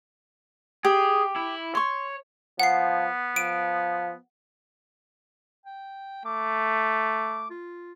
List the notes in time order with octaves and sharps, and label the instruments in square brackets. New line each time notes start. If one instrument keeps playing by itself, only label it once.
[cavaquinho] G4 [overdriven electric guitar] G#4
[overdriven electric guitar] E4
[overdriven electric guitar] C#5 [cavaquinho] C6 C#6
[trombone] F3 [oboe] B3 [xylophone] F#5 C7
[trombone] F3 [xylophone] D7 D#7
[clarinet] G5
[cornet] A3 [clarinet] D6
[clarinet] F4